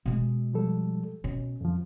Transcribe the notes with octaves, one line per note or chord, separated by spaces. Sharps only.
B2 G#3
F3 G3 A4
B2 C#4
F2 F3